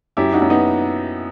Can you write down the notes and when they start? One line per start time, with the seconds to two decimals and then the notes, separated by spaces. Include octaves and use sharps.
0.17 F#2 E4 G4
0.33 D#4 F#4
0.42 F#2
0.50 B3 D#4